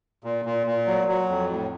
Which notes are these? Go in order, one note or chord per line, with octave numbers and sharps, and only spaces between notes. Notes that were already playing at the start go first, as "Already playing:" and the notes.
A#2
A#2
A#2
F#3
F#3
F2
A2